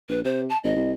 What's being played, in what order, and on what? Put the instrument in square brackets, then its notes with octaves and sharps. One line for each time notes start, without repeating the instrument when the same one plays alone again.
[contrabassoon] A#1 [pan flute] B4
[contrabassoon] C3 [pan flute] C5
[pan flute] A5
[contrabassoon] G#1 [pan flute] D#5
[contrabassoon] C2